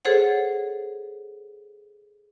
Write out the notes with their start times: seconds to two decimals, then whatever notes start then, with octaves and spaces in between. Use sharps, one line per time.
0.05 G#4 A4 C5 C#5 F#5